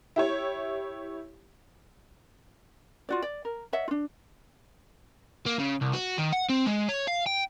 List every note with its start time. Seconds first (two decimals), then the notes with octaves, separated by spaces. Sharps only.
0.16 E4 G4 C#5
3.09 F4 F#4 D5
3.22 D5
3.45 A#4
3.73 C#5 D#5 E5 F#5
3.88 D4 F4
5.46 A#3
5.59 C#3
5.82 C2
5.94 F#4
6.18 D#3
6.33 F#5
6.49 C4
6.66 G#3
6.89 C#5
7.08 F5
7.27 G5